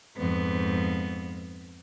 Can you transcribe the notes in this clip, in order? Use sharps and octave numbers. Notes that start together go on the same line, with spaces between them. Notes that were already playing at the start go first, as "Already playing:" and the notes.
F2 G#2 B3